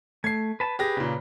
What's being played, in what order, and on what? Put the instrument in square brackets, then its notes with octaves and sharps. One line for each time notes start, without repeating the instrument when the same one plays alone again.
[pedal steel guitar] A3 [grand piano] G#6 C7
[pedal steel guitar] B4 A5
[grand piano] G4 G#4 A#6 [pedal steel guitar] B4
[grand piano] A#2 C#3